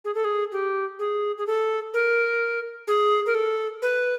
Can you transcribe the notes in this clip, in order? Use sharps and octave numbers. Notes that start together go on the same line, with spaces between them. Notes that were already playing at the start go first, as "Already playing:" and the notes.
G#4
A4
G#4
G4
G#4
G#4
A4
A#4
G#4
A#4
A4
B4